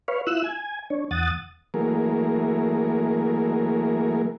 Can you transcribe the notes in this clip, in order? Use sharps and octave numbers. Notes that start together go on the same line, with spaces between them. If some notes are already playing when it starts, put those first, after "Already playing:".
B4 C#5 F5
E4 F4 E6 F#6
G#5
D4 C#5
E2 F#5 D#6 A6
E3 F#3 A3 A#3 G#4 A#4